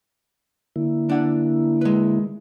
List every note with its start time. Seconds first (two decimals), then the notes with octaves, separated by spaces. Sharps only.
0.76 D3 A#3 E4
1.10 D4 F#5
1.81 G#3 B4